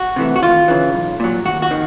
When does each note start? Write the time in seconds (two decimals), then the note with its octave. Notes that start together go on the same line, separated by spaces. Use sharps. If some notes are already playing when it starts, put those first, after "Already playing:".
Already playing: F#4
0.16 C3 E3 A3
0.36 F#4
0.42 D#2 F4
0.68 C#3 E3
0.94 B1
1.20 A#2 F#3
1.45 D#2 F#4
1.62 F#4
1.71 D#3